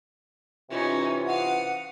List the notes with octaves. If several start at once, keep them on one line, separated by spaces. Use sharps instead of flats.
C3 E3 C#4 D#4 F4
F5 F#5 D#6